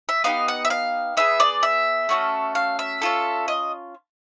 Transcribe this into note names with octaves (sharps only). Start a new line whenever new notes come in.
E5
B3 D#4 G4 F5
F#5
E5
F5
B3 E4 G#4 E5
D5
E5
A3 C#4 F#4 A4
F5
E5
C#4 F4 A4
D#5